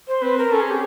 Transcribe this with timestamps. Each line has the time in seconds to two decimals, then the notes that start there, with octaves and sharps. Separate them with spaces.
0.08 C5
0.22 C4 B4
0.38 A#4
0.52 C#4 A4
0.61 G#4
0.71 G4